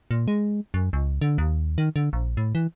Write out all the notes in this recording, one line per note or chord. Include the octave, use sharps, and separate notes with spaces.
A#2
G#3
F#2
C#2
D3
D#2
D#3
D3
A#1
A2
E3